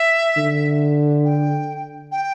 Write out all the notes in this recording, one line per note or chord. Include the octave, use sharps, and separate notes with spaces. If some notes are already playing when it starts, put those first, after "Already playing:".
Already playing: E5
D3
G5
G5